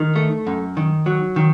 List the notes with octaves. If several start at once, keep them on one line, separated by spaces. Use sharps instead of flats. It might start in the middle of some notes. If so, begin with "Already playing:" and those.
Already playing: D#3
A3
F#2
D#3
F#3
D#3